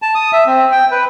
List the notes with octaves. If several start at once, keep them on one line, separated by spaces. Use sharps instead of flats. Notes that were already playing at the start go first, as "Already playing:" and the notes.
A5
D#6
E5
C4
G5
B4